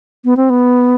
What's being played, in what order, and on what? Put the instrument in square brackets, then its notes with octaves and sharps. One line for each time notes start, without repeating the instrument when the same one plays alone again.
[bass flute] B3
C4
B3